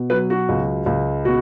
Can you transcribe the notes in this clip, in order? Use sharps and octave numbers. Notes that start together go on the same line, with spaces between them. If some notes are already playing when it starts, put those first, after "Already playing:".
Already playing: B2
F#3 B4
F#4
C#2
C#2
B2 F#4